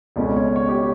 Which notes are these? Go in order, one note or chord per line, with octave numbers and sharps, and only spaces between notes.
C#2 B2 A3 C#4 D5
C#5
C#5
G4